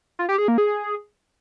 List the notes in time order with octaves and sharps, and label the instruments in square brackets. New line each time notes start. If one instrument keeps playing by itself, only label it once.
[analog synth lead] F4
G4
G#4
A#3
G#4